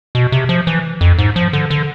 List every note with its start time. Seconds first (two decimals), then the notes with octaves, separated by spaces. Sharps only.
0.15 B2
0.32 C3
0.49 F3
0.67 E3
1.01 F2
1.18 G#2
1.36 F3
1.53 D3
1.70 D3